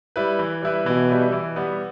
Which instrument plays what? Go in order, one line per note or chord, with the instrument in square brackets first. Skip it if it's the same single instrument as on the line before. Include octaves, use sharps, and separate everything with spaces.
[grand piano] G3 E4 B4
E3
G3 E4 B4
[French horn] B2 [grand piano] E3
[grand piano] G3 E4 B4
E3
G3 B3